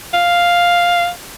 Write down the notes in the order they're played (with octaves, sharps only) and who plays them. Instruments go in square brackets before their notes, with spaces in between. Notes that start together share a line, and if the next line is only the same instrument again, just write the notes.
[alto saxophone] F5